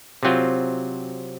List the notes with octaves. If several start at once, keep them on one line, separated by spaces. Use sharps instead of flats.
C3 F#3 C4 F4